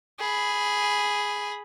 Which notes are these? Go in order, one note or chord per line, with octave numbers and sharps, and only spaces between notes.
G#4 B5